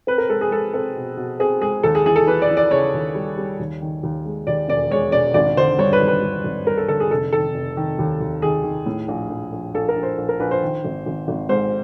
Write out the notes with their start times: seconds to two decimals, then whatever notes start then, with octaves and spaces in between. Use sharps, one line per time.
0.07 C4 B4
0.18 A#4
0.29 G#3 A4
0.41 G#4
0.51 G#3 A4
0.73 C4 A4
0.96 B2
1.17 B2
1.40 C4 G#4
1.61 G#3 G#4
1.83 D#2 A4
1.95 G#4
2.06 E3 G#4
2.16 A4
2.27 E3 B4
2.42 D5
2.50 E3
2.57 D5
2.71 C#3 C#5
2.94 D#2
3.15 G3
3.37 G3
3.59 D#2
3.82 D#3
4.03 D#2
4.25 G#3
4.47 D#2 D5
4.68 E1 D5
4.91 G#3 C#5
5.12 E1 D5
5.34 G#1 D5
5.57 D3 C5
5.79 G2 C#5
5.93 B4
6.01 G#1
6.08 B4
6.22 G2
6.44 G#1
6.67 G2 A#4
6.77 A4
6.88 D3 A4
7.00 G#4
7.10 F1 A4
7.33 D#3 A4
7.54 F1
7.77 D#3
7.99 D#2
8.21 D#2
8.42 D#3 G#4
8.64 D#3
8.86 A2
9.08 A#1
9.30 A#1
9.52 A#1
9.74 A#1 A4
9.89 A#4
9.96 A#1
10.03 C5
10.18 A#1
10.29 A#4
10.40 A#1 B4
10.51 C5
10.62 D#3
10.84 G#1
11.06 G#1
11.28 G#1
11.49 G#2 C5